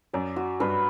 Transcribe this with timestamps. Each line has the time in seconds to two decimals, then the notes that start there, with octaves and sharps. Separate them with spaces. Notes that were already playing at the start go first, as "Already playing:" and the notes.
0.13 F#2 D5
0.36 F#4
0.60 G2 B4